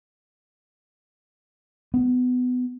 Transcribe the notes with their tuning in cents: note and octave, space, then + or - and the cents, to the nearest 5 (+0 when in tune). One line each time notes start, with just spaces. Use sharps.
B3 +20